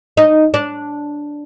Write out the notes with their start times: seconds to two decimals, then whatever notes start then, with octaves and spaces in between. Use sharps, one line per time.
0.17 D#4
0.54 D4